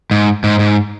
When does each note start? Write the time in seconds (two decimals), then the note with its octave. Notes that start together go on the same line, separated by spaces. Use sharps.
0.11 G#2
0.44 G#2
0.59 G#2